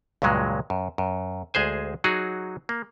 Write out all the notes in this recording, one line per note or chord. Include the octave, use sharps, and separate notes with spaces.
C#2 G2 A#2 F#3 G#3
F#2
F#2
D2 G#3 G#4 C5 G#5
F#3 D#4 F#4 G#4
A#3